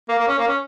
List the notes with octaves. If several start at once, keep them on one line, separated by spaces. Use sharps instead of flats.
A#3
A#3
C#4
A#3
C#4